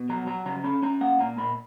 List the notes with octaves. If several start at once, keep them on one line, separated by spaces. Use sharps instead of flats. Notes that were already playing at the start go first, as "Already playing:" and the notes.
Already playing: B2
F#3 A#5
F#3 A#5
C#3 A#5
C#4 B5
C#4 A#5
A#3 F#5
A#2 A#5
A#2 B5